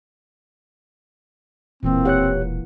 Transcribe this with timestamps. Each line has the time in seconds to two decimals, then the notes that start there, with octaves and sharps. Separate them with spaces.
1.83 E1 A#2 E3 A#3 C4
2.05 G4 C#5 F#5 F#6